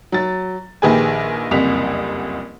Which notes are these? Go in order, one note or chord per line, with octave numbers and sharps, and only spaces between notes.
F#3 A6
A#1 D#3 G4 G#4 B4 G#5
F#1 C2 F2 B6 F7